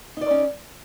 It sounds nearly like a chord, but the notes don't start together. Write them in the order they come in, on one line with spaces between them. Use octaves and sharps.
D#4 D5 A#4 C#4